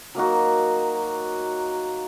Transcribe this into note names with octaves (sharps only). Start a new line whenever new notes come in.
F#3 A#3 D#4 F#4